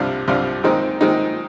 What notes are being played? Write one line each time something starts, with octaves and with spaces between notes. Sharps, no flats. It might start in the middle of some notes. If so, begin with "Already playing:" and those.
Already playing: C2 C3 G3 D4 F4
C2 C3 G3 D4 F4
D#3 G#3 C4 D#4
D#3 G#3 C4 D#4